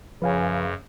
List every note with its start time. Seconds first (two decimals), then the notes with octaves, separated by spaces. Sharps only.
0.22 F#2 C#3 F3 B4 F5 G#5